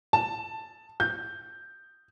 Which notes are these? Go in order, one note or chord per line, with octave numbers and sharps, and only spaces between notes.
A5
G6